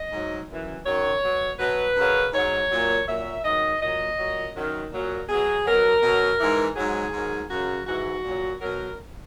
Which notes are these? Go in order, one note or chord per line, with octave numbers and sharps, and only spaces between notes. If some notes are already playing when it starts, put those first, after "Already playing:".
Already playing: D#5
G#2 F#3
F#2 E3
F#2 D#3 F#3 C#5
B2 F#3
B2 F#3 B4
F#2 C#3 F#3
G#2 F#3 C#5
A#2 F#3
A#2 F#3 E5
G#2 D#3 F#3 D#5
A#2 F#3 D#5
A#2 F#3
F#2 D#3 F#3
A#2 F#3
B2 F#3 G#4
B2 F#3 A#4
B2 F#3
G#2 E3
G#2 F#3 G#4
G#2 D#3 F#3
F#2 C#3 F#3 F#4
G#2 E3 F#4
A#2
F#3
B2 F#3 A#4